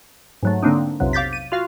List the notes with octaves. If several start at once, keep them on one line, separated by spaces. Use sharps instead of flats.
G#2 F#3 A3
D3 A#3 C4 D4 D#4
B1 F2 C3 F#3
F5 D6 G6 A6 B6
D#7
F4 F#4 F5 F6